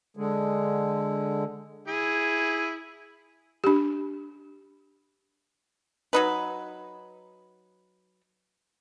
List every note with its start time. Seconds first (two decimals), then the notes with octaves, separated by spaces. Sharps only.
0.17 D3 G#3
1.88 E4 G#4
3.64 D4 G4
6.13 F#3 D#4 B4